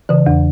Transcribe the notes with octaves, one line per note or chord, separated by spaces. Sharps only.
C#3 E3
E2